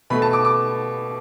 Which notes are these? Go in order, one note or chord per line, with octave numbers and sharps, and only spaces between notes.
B2 A3 B5
A5
D6
D6